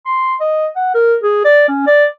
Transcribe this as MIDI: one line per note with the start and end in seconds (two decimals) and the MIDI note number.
0.06 0.34 84
0.40 0.67 75
0.76 0.92 78
0.94 1.16 70
1.23 1.43 68
1.45 1.64 74
1.68 1.82 61
1.87 2.05 74